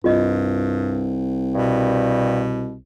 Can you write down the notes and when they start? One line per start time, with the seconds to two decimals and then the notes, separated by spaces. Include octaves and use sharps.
0.04 C2 G2 F4 D#5
1.54 G2 B2